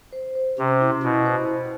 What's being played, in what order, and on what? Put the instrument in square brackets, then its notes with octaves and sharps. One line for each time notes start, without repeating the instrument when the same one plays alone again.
[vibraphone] C5
C5
[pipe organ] C3 [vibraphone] C#4
[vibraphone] E4
[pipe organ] B2 [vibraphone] E4
[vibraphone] C5
C5